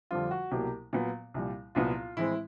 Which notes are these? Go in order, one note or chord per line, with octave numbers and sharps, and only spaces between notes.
F2 D3 G3 C4 F4
F#4
C2 B2 F#3 A#3 G4
A#2 F#3 B3
C2 A#2 G3
C2 A#2 F#3 B3 F4
A2 E3 G#3 C4 E4